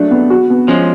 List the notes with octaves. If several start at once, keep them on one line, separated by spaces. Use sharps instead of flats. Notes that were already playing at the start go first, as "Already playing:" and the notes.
Already playing: F#3 A3 D4
B3
F#4
B3
F3 G#3 C#4